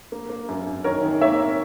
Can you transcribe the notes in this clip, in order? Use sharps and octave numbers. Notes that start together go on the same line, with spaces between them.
A#3
A#3
F#2
F#2
D#3 A#4 C#5
D#3
A#3 C#5 E5